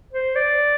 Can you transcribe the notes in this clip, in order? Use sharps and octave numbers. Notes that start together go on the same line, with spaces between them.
C5
D5